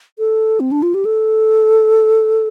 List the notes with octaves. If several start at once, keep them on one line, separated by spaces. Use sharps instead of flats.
A4
C4
D4
F4
G4
A4